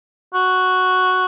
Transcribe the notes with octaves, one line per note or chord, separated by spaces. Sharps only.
F#4